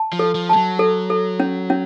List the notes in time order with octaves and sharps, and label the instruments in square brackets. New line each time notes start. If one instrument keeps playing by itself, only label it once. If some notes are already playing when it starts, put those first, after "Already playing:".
Already playing: [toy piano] A5
[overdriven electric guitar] F3
[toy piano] A4
[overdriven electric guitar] F3
[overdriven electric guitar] G3 [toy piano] A5
[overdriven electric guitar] F#3
[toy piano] A4
A4
C#4
C#4